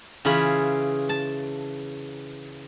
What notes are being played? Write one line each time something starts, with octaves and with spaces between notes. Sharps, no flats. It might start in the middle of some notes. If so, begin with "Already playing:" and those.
C#3 E3 F4 G#4 B5
A5